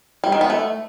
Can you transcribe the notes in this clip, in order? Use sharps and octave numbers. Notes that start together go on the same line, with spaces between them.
G3
D#3
B3
A3